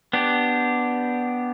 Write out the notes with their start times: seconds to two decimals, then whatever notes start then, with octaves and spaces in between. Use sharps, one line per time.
0.13 B3 D4 G4